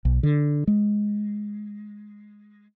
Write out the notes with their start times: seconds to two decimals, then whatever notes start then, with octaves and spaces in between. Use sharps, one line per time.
0.05 B1
0.23 D3
0.67 G#3